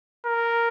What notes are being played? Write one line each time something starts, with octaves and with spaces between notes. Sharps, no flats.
A#4